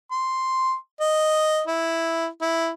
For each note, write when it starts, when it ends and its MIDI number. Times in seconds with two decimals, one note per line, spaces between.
0.11 0.74 84
1.00 1.62 75
1.67 2.27 64
2.42 2.70 64